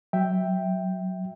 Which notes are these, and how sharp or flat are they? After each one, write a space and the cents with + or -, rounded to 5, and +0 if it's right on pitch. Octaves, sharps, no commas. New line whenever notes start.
F#3 +0 E5 +0 G5 +0